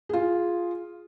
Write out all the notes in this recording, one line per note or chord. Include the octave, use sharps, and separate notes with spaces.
F4 G#4